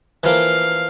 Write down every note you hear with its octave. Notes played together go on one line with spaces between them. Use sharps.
E3 F3 A#3 F5